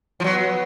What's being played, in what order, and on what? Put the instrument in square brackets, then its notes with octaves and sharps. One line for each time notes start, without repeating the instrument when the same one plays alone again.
[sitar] F3
[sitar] F#3 [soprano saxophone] B3